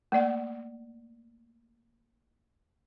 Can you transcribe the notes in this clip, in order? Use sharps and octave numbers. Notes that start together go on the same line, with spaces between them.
A3 A#3 D5 F#5